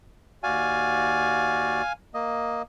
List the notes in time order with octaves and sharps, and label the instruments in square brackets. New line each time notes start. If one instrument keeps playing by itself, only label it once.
[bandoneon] D#2 F#4 D5 [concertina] F5 G#5
[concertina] A#3 D#5